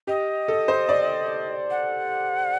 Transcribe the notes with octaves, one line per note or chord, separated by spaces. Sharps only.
G4 D#5
A4
C5
D5
F#5